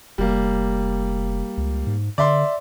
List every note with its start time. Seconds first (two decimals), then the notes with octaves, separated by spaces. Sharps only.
0.18 F1 G3 A#3
1.57 C#2
1.87 G#2
2.18 D3 D5 E5 C6